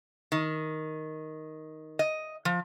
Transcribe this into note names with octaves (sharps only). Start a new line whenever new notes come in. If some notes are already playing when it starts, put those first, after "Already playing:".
D#3
D#5
F3